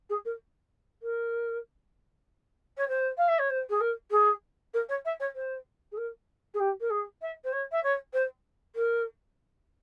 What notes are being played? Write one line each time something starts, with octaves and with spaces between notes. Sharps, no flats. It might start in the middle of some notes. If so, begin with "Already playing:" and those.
G#4
A#4
A#4
C#5
C5
F5
E5
C#5
C5
G#4
A#4
G#4
A#4
C#5
E5
C#5
C5
G#4
A#4
G#4
G4
A#4
G#4
E5
C5
C#5
E5
C#5
C5
A#4